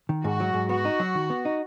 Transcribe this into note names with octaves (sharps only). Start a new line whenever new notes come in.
D#3
G#2 F#4
F#3
G#2
B3 F#4
D#4
F#3
D#3
B3
D#4